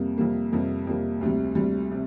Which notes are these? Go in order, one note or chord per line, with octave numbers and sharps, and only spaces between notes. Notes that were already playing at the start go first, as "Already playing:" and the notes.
Already playing: F2 C3 G3 A#3
F2 C3 G3 A#3
F2 C3 G3 A#3
F2 C3 G3 A#3
D2 C3 G3
D2 C3 G3
C3